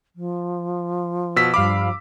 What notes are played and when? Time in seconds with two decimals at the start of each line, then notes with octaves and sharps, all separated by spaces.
0.15 F3
1.36 B2 E6 B6
1.54 G2 F5 B5 D6